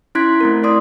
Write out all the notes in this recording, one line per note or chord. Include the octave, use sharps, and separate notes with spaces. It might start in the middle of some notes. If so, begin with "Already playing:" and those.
C#4 E4 C6 F#6 G#6 B6
A3 C4 A#4
E4 D5 C6 D#6